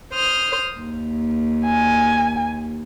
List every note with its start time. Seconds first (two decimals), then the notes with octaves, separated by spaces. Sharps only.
0.13 C5 D#6 F6
0.78 D#2
1.65 G#5